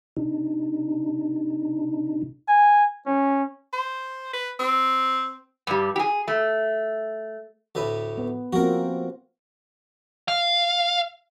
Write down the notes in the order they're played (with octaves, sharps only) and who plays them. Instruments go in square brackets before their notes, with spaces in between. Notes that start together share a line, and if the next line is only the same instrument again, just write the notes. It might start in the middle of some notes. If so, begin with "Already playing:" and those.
[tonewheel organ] C3 D4 D#4
[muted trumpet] G#5
C#4
[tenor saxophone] C5
B4
C4
[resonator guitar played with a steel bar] G2 G3
G4 G#4
A3
[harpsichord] D2 A2 B4
[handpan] B3
[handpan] F3 A#3 C4 [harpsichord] F#4 A#4
[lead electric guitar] F5